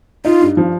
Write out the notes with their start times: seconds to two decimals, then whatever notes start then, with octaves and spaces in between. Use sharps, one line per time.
0.25 D#4 F4
0.42 G2
0.57 F3